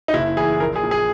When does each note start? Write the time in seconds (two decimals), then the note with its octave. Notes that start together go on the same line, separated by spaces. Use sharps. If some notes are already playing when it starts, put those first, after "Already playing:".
0.08 D#4
0.14 F#1 E4
0.37 E3 G#4
0.60 A#1 A#4
0.76 G#4
0.84 A#2
0.91 G#4